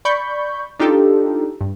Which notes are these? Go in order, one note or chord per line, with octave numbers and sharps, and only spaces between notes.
D5 B5 C#6 G6
D4 D#4 F4 G4 A4
G2